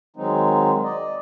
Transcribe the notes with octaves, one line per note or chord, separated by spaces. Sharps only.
D#3 F#3 G#3 C4 D#4
D5 D#5